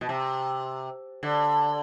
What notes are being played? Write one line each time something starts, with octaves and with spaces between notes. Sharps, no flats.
B2
C3
D3